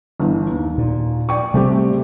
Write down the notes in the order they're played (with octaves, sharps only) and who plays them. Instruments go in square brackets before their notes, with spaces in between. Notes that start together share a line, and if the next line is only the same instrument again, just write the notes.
[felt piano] G1 E3
D#2
[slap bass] A#2
[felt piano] D5 G5 C#6
[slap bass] C3 G3 [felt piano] A3 C4 G4